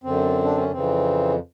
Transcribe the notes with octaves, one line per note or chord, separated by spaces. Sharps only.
F#2 D3 C4
D4
C#4
F2 C#3 E3 C4